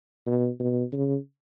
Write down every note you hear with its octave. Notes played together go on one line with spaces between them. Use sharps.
B2
B2
C#3